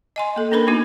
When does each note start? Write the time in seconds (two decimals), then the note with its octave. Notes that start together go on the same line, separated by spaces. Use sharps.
0.16 D#5 G#5 C6
0.36 A#3 A4
0.51 A#3 C#4 D4 A#4 B4 B5
0.67 A#3 B3 D4 D#4 F#4